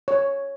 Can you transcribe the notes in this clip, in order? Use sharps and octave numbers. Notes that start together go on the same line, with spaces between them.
C#5